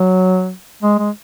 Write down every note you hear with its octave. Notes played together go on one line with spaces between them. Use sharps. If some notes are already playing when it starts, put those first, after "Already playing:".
Already playing: F#3
G#3
G#3